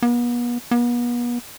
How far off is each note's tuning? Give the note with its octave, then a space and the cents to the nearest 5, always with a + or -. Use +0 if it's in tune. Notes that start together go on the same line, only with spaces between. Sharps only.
B3 -40
B3 -40